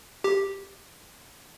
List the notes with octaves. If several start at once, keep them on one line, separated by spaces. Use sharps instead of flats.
G4